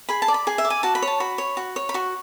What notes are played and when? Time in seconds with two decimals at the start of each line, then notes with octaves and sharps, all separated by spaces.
0.09 G#4 B5
0.22 A5
0.28 D5
0.34 B5
0.47 G#4 G#5
0.58 E5
0.65 D5
0.70 G#5
0.83 F#4 A5
0.95 B5
1.02 C#5
1.08 A5
1.20 F#4 B5
1.38 C#5
1.57 F#4
1.76 C#5
1.89 B5
1.94 F#4 C#6